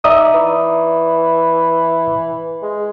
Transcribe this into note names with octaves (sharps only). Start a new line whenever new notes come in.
D#4 D5 E5 D#6
E3
G#3